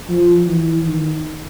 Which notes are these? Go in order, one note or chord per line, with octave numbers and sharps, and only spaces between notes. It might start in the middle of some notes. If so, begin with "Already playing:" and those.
F3
E3
D#3